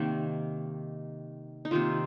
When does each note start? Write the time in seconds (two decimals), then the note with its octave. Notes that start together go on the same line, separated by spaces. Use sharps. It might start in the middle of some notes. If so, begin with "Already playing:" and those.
Already playing: C3 D#3 A#3
1.65 D#4
1.71 C3 D#3 A#3 F4